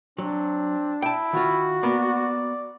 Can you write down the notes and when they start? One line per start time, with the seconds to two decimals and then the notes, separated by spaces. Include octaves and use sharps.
0.18 F#3 C4 D4
1.02 E4 G5 A5
1.33 D#3 F4 F#4
1.83 A#3 B3 D5